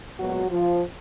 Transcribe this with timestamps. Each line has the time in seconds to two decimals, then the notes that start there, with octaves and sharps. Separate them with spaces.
0.20 A#2 F#3 G#3 B3 F#4
0.51 F3 F4